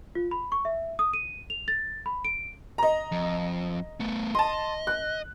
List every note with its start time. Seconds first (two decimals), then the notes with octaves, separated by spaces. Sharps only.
0.15 F4
0.31 B5
0.52 C#6
0.65 E5
0.99 D#6
1.13 D#7
1.50 F7
1.68 A6
2.06 B5
2.25 D7
2.78 D#5 A#5
3.12 F2
4.00 A3 B3
4.35 D#5 A5 C6
4.87 F#6